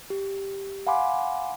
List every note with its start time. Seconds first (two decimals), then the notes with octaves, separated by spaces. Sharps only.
0.10 G4
0.87 F5 F#5 G#5 B5 C6 D6